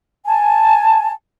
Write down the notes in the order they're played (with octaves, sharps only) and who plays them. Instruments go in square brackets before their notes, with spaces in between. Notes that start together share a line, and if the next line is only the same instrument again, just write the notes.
[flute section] G#5 A5